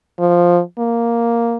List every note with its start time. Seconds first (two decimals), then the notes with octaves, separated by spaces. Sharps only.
0.19 F3
0.79 A#3